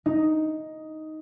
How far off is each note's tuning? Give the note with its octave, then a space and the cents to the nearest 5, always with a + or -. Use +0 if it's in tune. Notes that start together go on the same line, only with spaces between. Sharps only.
D#4 +5